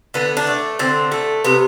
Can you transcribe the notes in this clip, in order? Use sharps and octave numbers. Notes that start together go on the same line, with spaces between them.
D3 B3
D4
A3
D3 C4
A3
C3 B3